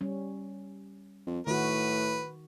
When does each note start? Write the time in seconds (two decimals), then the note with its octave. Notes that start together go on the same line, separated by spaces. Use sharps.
0.01 G3 C#4
1.27 F2
1.47 A2 D#3 F#4 B4